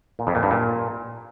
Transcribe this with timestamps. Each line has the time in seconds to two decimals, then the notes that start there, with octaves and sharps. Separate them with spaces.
0.19 A#2
0.27 F2
0.35 A#2
0.43 G2
0.51 A#2